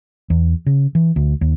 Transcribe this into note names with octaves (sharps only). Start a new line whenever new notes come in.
E2
C#3
E3
D2
D#2